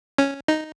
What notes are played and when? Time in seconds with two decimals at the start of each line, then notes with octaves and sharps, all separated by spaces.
0.18 C#4
0.48 D#4